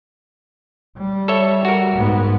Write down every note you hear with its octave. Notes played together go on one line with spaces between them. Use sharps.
G3
A4 C#5 E5
F#4 A#4
G#2 B3